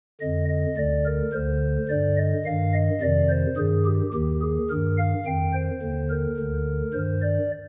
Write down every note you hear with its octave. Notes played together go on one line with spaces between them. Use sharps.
F2 D3 D#5
D#5
D2 D3 D5
A#4
D2 D3 C5
G2 D3 D5
D#5
G2 D#3 F5
D#5
F2 C3 D#3 D5
C5
G2 D#3 G#4
G4
D#2 D#3 G4
G#4
G2 D#3 A#4
F5
F2 D#3 G5
C5
D#2 D3
A#4
D2 D3
G2 D#3 C5
D5